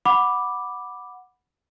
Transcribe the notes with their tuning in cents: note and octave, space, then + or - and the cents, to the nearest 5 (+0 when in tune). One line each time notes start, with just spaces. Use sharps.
F#5 -5 B5 +0 D6 +0